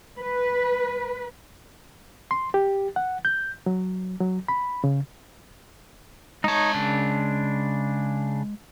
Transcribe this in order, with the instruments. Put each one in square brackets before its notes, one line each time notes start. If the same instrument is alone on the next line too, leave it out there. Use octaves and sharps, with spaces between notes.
[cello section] B4
[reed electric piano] C6
G4
F#5
G6
F#3
F#3
B5
C#3
[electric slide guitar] G#3 A5 [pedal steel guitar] D#4 C#5
[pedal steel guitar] C#3 D4